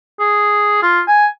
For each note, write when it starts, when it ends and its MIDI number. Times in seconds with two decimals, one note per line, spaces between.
0.20 0.82 68
0.83 1.01 65
1.08 1.26 80